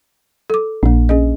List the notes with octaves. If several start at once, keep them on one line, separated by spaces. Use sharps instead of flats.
A4 D6
A#1 A#3 D4
C#4 G#4 D#5